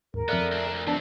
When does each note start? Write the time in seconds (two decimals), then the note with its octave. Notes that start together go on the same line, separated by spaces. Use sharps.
0.14 D#2 G#2 A#4
0.29 F2 B3 A4 D5 E5 F6 F#6
0.52 D2 D4
0.71 D2
0.87 C3 F3 B3 D4 D5 A5